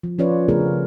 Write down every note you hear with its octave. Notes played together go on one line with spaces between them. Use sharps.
F3
F3 C#4 F4 B4 C#5 D5
C#3 A3 B3 D4 G#4 A#4